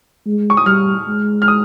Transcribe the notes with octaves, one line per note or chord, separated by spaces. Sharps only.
G#3
C#6
D#6
G3 F6
G#3
F6
D#6